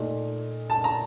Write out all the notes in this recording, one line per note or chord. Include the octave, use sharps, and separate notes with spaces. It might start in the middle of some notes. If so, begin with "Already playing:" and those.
Already playing: A#2 A3 D#4
A5
A#5